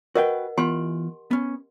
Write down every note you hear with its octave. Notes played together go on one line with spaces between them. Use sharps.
F#4 A#4 B4 D#5 F#5 G5
E3 B3 F4 G4 G#5 C6
B3 C#4